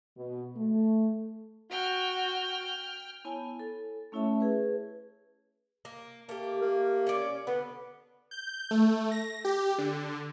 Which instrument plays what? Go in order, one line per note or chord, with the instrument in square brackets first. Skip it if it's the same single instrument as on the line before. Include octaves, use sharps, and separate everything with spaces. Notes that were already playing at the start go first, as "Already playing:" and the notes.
[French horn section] B2
A3
[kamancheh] F#4 [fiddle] G5 F6
[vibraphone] B3 E4 C#5 G#5 A5 B5
A4
A3 C#4 E4 C#5 E5 A5
G#4 B4
[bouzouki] A#3
[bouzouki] A3 G4 [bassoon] A#3
[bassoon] A#3
[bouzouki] C#4 D5
[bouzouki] D3 [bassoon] B3
[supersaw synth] G6
A3
A#6
G4
D3